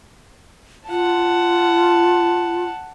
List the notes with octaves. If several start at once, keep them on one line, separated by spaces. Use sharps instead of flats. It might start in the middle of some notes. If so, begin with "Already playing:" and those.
F4 F#5 A5